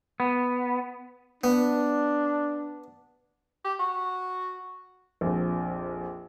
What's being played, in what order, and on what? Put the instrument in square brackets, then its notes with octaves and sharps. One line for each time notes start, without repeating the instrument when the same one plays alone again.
[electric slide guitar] B3
[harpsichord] B3 [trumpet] D4
[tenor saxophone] G4
F#4
[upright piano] A#1 F2